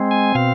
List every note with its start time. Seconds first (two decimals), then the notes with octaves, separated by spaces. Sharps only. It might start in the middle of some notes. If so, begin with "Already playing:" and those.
Already playing: G#3 C4
0.11 G#5
0.35 B2 F5